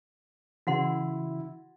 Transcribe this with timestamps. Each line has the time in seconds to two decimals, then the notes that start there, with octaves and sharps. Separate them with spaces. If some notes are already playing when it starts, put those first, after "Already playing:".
0.67 C#3 E3 E4 F#4 F#5 C6